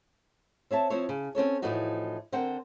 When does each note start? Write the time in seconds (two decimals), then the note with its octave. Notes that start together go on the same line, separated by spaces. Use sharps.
0.71 C4 C#5 E5 A5
0.90 F3 C4 E4 C5 C#5
1.09 C#3
1.35 C4 C#4 A4 C#5
1.62 A2 E3 F3 A3 D#4 F#4
2.32 D3 C4 A#4 C5 F#5 G5